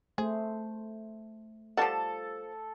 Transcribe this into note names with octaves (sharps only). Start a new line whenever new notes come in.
A3 G#4 C5
F3 G3 F4 A4 D5 F#5 A5